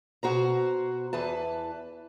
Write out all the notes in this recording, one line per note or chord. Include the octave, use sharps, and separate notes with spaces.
B2 F#4 C5 A#5
E2 E3 B4 A5